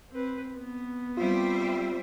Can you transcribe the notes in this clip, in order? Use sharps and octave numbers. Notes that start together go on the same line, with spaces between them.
C4 B4
B3
G3 C4 F4 C5 E5